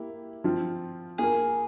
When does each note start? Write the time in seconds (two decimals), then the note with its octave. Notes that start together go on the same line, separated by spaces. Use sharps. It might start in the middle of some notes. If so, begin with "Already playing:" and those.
Already playing: A#3 E4 G4
0.44 F3 C4 F4
1.18 A#3 F4 G#4 A#4